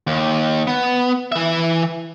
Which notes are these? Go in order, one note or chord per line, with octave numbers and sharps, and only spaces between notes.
D#2
B3
E3 E5